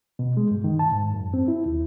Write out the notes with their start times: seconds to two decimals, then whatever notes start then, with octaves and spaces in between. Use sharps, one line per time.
0.19 B2
0.37 G#3
0.51 G2
0.64 D#3
0.79 A5
0.91 G#2
1.14 F#2
1.34 C4
1.48 E4
1.66 D#2